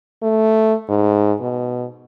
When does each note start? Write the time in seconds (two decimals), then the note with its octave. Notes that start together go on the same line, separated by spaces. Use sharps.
0.23 A3
0.89 G#2
1.41 B2